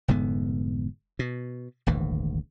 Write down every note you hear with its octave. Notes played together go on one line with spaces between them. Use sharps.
F1 G#2 D3 B3
B2
D#1 G#1 D2 E3